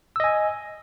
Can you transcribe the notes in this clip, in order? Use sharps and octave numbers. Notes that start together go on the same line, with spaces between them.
D#5 G#5 E6